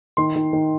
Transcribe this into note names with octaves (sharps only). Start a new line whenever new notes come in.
D#3 C6
D#3
D#3